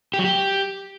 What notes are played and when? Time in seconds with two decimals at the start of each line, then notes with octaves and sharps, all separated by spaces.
0.14 G4
0.19 F#3
0.24 G4